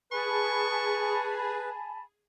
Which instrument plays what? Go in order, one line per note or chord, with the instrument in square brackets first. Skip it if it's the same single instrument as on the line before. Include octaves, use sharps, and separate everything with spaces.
[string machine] G#4 [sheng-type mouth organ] B4 [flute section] G#5 A5 B5 [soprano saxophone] C#6